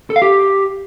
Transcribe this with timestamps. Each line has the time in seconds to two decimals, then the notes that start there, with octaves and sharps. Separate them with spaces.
0.10 A4
0.16 F5
0.22 G4